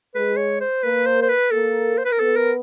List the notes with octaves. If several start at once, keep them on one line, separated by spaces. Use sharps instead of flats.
G#3 G#4 B4
C#5
C5
A#3 A#4 B4
C5
C5
B4
A#3 A4 A#4
C5
B4
A#4
B3 A4 B4
A#4